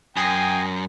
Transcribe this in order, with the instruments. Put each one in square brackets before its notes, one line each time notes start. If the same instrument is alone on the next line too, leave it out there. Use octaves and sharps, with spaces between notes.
[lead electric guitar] F#2 [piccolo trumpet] G5 [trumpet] G#5 [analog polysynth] D#6 A#6 C7